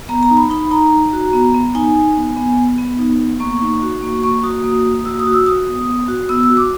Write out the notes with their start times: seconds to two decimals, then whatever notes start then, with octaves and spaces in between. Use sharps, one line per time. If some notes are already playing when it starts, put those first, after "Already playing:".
0.09 B3 A#5
0.23 A#5
0.30 D#4
0.37 B5
0.50 D#4 B5
0.71 D#4 A#5
0.93 D#4
1.13 F#4
1.33 B3
1.54 B3
1.75 D#4 G#5
1.96 D#4
2.17 B3
2.36 B3
2.57 B3
2.78 B3
2.99 D#4
3.20 B3
3.40 A#3 C#6
3.61 D#4
3.82 F#4
4.03 A#3
4.23 A#3 C#6
4.44 F#4 D#6
4.64 A#3
4.85 A#3
4.99 D#6
5.05 F#4 E6
5.19 D#6
5.27 F#4
5.33 E6
5.46 F#4 D#6
5.68 B3
5.88 B3
6.08 F#4
6.29 B3 E6
6.43 E6
6.50 F#4
6.57 D6